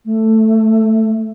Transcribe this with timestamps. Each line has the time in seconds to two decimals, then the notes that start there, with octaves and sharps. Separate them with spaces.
0.05 A3